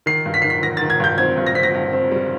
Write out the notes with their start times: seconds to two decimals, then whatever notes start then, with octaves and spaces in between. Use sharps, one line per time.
0.06 D#3 C7
0.26 G2
0.34 B6
0.42 D#3 C7
0.50 B6
0.62 D#3 A#6
0.77 D#3 A6
0.90 G#6
1.00 G2 G6
1.18 C4 G#6
1.37 G2
1.46 A#6
1.55 C4 B6
1.63 A#6
1.74 G2
1.93 C4
2.12 G3